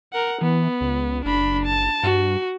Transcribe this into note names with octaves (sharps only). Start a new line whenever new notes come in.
A#4 F#5
E3 B3
C#2
F#1 D4 B5
A5
G2 F#4